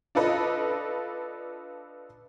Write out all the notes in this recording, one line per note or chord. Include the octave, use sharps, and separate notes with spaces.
D4 F4 A4 B4 D#5